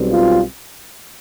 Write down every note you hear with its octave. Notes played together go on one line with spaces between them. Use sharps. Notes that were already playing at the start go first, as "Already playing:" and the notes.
Already playing: B1 B2 G3 C4
F4